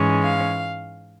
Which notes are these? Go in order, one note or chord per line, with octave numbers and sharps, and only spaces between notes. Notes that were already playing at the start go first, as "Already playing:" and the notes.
Already playing: G#2 E3 G#3 C#4
F5